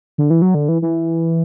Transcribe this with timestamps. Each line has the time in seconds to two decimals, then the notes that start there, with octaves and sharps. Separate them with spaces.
0.18 D3
0.30 E3
0.42 F#3
0.54 D3
0.69 E3
0.82 E3